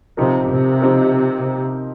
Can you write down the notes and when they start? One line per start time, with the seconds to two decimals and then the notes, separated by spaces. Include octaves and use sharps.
0.17 C3 F3 C4 D#4 G4 A#4
0.50 C3
0.81 F3 C4 D#4 G4 A#4